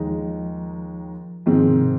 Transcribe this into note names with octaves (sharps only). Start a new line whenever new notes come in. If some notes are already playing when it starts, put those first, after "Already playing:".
Already playing: D#2 D#3 F3 G#3 D#4
G#2 D#3 F3 G#3 C4
C3